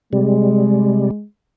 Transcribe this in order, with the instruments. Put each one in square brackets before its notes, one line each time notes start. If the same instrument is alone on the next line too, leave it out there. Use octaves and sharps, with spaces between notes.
[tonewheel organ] C3 G3 [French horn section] G#3